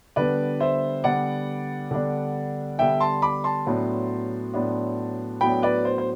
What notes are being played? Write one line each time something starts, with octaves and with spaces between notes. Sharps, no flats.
D3 G3 B3 D4 B4 D5
C5 E5
D3 G3 B3 D4 D5 F#5
D3 G3 B3 D4
D3 G3 B3 D4 E5 G5
A5 C6
B5 D6
A5 C6
A2 F#3 B3 D4
A2 F#3 B3 D4
A2 F#3 B3 D4 G5 B5
B4 D5
C5
C5